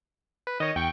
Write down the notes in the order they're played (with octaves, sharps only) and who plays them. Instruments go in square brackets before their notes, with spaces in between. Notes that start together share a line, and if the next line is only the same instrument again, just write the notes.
[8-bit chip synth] B4
[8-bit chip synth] D#3 C#5 [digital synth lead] D#5
[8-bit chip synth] E2 C#6 [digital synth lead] G5